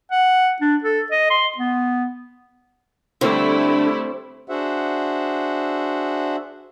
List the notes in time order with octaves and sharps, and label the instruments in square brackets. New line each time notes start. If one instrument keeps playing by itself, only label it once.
[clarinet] F#5
D4
A4
D#5
C6
B3
[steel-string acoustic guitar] D3 [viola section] G3 A3 E4 [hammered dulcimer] C4
[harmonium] D4 F#4 G#4 C5 E5 F#5